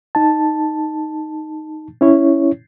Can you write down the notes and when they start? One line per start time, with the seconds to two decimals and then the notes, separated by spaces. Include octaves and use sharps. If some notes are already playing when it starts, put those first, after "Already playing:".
0.15 D#4 A5
2.01 C#4 E4 C#5